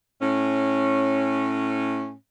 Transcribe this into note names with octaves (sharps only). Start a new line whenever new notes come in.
A2 C#4